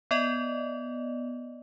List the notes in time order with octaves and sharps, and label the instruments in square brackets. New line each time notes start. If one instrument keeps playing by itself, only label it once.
[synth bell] B3 D5 D#5